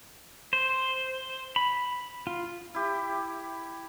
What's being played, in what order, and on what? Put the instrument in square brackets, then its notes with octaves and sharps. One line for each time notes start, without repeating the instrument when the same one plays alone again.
[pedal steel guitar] C5
B5
F4
[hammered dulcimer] E4 G4